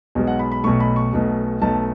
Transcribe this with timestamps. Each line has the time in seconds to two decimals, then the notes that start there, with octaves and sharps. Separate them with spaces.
0.15 B1 B2 G#3
0.27 F#5
0.39 B5
0.52 B5
0.64 B1 B2 A3 C#6
0.80 B5
0.96 C#6
1.13 B1 B2 A3
1.61 B1 B2 A3 A5